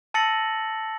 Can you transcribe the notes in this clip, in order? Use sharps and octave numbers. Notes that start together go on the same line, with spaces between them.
A5 E6 A6 A#6 C#7 F#7